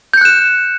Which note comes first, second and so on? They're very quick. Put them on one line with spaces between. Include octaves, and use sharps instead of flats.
G6 C#7 F#6 E7